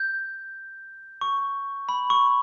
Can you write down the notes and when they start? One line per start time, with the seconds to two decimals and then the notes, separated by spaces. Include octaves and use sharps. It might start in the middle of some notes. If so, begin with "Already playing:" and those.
Already playing: G6
1.21 C#6
1.89 B5
2.10 C#6